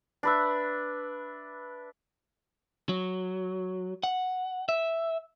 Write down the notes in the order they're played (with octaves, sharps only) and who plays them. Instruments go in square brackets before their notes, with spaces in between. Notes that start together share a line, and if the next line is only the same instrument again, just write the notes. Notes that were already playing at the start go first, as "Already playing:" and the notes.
[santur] D4 B4 E5
[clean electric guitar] F#3
F#5
E5